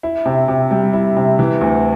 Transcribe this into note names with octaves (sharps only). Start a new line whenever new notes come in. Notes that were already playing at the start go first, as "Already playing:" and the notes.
E4
C3
C3
G3
E4
C3
E3
D2